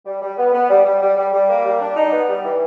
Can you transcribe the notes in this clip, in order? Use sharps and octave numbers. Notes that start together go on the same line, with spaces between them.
G3
G3
B3
B3
G3
G3
G3
G3
G3
A#3
G3
D4
D#4
B3
G3
E3